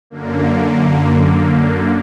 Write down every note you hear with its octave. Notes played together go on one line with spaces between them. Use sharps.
F#2 D3 A#3